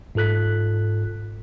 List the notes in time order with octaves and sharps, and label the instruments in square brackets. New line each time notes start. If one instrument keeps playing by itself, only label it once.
[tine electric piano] G#2 F4 A4 F#6 B6